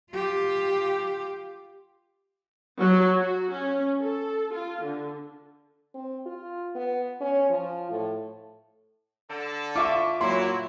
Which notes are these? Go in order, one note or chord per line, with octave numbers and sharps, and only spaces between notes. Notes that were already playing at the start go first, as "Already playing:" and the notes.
F4 G4
F#3
F#4
C#4
A4
F4
D3
C4
F4
B3
C#4
F3
A2
D3 A4
F4 E5 C#6 D6
A#2 F#3 E4 C6